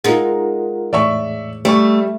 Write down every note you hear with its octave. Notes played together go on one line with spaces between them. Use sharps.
G#3 D#4 F4 A#4 F#5
E2 A2 D5 E5 C#6
G3 A3 C#6